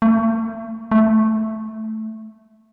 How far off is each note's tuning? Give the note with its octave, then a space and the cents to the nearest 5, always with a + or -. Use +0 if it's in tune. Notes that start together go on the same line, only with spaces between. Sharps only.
A3 +35
A3 -5